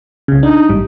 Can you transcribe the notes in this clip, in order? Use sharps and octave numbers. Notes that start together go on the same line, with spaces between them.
C2 C#3
D4 D#4
A1 G#2 G3